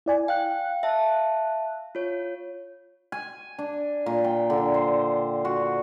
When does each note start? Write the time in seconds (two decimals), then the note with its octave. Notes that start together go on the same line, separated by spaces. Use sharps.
0.06 E4 D5 G#5
0.28 F5 G5 F#6
0.83 E5 A5
1.95 F4 C#5
3.12 G#5
3.59 D4
4.06 A#2
4.24 G5
4.50 D3
4.74 C5
5.45 F#4